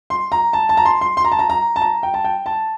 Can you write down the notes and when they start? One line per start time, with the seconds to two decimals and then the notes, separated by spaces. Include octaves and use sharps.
0.10 C6
0.32 A#5
0.53 A5
0.69 A5
0.77 A#5
0.85 C6
1.01 C6
1.17 C6
1.24 A#5
1.32 A5
1.39 A#5
1.50 A#5
1.76 A5
1.82 A#5
2.03 G5
2.14 A5
2.24 G5
2.46 A5